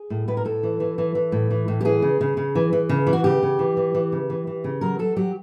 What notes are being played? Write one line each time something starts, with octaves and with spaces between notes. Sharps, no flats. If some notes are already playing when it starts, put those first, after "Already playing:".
Already playing: G#4
A2
A2 B4
A#4
A2 A4
E3
E3
E3
E3
A2
E3
A2
G4
E3 G#4
C#3
C#3
C#3
E3
E3
C#3
E3
F#4
C#3 G4
C#3
E3
E3
E3
C#3
E3
E3
C#3
F#3 A#4
F#3 A4
F#3 G4